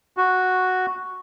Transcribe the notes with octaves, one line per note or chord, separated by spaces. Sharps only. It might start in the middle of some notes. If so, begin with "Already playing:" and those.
F#4